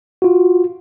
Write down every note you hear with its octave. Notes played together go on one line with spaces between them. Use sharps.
F4 F#4